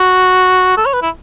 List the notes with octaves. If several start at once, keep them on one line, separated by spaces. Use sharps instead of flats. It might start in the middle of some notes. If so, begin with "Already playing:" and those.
Already playing: F#4
A4
C#5
B4
E4